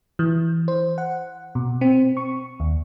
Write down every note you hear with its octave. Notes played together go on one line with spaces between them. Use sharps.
E3
C5
F#5
B2
C4
C#6
D#2